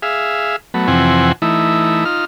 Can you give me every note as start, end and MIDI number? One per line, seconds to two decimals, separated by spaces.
0.02 0.56 68
0.02 0.56 76
0.02 0.56 77
0.74 0.87 54
0.74 0.87 57
0.74 0.87 59
0.88 1.32 41
0.88 1.32 48
0.88 1.32 52
0.88 1.32 60
0.88 1.32 78
0.88 1.32 80
1.42 2.04 52
1.42 2.04 57
1.42 2.04 63
1.42 2.04 64
2.05 2.25 63
2.05 2.25 65
2.05 2.25 89